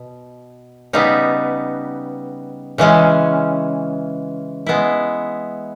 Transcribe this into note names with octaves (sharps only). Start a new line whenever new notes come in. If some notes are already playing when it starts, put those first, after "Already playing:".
Already playing: B2
C#3 G3 B3 D#4
C#3 E3 G#3 C#4
G#3 B3 E4